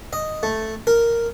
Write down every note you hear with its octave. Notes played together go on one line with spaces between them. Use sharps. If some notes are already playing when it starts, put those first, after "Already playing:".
D#5
A3
A#4